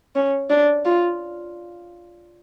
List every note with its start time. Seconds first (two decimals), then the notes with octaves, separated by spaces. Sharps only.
0.16 C#4
0.50 D4
0.85 F4